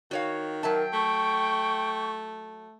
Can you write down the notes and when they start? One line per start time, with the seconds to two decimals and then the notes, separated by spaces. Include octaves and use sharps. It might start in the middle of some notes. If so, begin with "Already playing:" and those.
0.11 D#3 F#4 C#5 F5
0.63 F#3 A#4 E5 G5 A5
0.93 A3 C#6